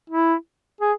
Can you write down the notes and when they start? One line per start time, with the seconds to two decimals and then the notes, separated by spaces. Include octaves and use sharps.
0.10 E4
0.81 G#4